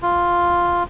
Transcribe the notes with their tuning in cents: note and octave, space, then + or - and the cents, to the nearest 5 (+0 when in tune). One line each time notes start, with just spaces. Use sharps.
F4 +0